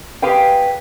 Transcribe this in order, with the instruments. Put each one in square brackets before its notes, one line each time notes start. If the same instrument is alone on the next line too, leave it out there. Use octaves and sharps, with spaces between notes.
[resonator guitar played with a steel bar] G4 G#4 B4 F5 G5